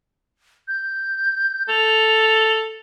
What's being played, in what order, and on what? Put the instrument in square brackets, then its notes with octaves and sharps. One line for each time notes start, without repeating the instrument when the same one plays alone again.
[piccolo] G6
[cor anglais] A4 [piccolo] F7